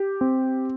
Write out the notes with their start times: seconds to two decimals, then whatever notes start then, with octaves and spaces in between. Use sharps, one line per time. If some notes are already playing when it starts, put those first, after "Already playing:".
Already playing: G4
0.21 C4